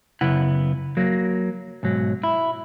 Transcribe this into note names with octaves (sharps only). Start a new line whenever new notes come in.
F#2 C#3 B3 E4 F#5
F#3 A#3
B1 G#2 F#3
E4